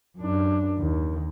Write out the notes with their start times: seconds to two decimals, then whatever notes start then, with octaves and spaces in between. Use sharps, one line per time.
0.17 F#2 D4
0.79 D#2